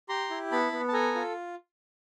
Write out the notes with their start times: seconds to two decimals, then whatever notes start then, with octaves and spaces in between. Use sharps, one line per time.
0.09 G4 A#5 C6
0.30 E4
0.51 B3 A5 B5
0.72 B3
0.88 A5
0.93 A4 G#5 A#5
1.15 F4